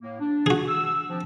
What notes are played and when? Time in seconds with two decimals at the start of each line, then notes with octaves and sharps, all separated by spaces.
0.02 A2 A#3
0.20 D4
0.46 F#4 G#4
0.68 E6
1.09 F3 C4 D4